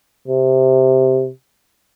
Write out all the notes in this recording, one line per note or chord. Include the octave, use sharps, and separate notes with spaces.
C3